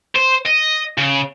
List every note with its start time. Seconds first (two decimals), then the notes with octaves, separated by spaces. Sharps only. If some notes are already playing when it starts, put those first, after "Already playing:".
0.16 C5
0.46 D#5
0.98 C#3